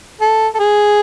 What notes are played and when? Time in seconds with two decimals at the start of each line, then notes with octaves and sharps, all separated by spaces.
0.21 A4
0.55 A4
0.59 G#4